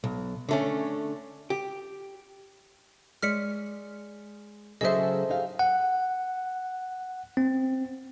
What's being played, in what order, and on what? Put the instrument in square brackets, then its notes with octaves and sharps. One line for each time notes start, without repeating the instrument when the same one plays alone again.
[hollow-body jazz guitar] B1
D3 A3 C#4
G4
[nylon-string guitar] G#3 C#5 D5 [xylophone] F6 B6 C#7
[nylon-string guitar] C#3 F#3 [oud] G#4 A4 C5 [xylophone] D#5 E5
[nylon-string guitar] D#4 G4 F5
[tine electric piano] F#5
C4